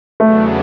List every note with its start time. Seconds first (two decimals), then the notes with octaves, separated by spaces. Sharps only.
0.20 E2 C#3 F#3 A3 B3 D4